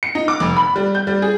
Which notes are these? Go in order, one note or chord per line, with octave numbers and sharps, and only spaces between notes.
C#7
D#4
D6
F1
B5
G3
G6
G3
G#4